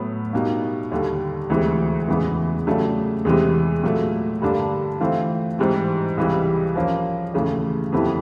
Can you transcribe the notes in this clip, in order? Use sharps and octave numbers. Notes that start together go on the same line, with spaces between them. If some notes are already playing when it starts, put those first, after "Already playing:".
Already playing: A2 F#3 B3
B2 G3 A#3 D#4
D#2 D3 G3
D2 C3 E3 G#3
E2 C#3 E3 G#3 B3
C#3 F#3 A3 D4 G4
E2 C3 E3 G#3
A#2 F#3 A3
G2 D3 G3 A#3 D4
E3 A3 C4 F4
G#2 E3 G3 C4
C#2 C3 E3 G3
F3 A#3 C#4
D#2 C#3 E3 A3
F2 D3 G3 B3 E4